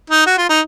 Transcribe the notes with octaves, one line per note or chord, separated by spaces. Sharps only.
D#4
F#4
F4
D#4